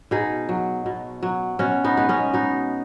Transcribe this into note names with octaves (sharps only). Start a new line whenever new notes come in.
B2 D#4 G#4
F#3
B2
F#3
B2 C#4 F#4
B3 D#4
G#3 B3
G#3 C#4
B2 B3 D#4